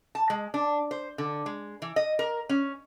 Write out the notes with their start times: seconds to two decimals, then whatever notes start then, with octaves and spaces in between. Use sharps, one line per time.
0.15 A5
0.30 G#3
0.54 D4
0.91 C5
1.18 D3
1.46 G#3
1.82 E3
1.96 D#5
2.19 A#4
2.49 C#4